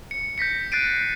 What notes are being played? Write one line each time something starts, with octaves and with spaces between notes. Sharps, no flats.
C#7
G6 A#6 B6 C#7
F#6 A6 C7 D7 D#7